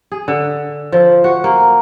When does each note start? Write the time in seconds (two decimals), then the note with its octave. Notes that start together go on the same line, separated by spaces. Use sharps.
0.12 G#4
0.28 D3
0.92 F3
1.24 F#4
1.44 A#3